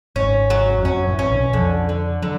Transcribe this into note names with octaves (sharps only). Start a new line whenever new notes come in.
G#1 G#2 C#4
F#3
F2
F#2 C#4
A1 A2
C#4
B1 B2
F2 D3 F3
D3
D3 F#3